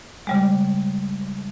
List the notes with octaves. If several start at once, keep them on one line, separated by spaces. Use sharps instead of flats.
C#3 G3 G#3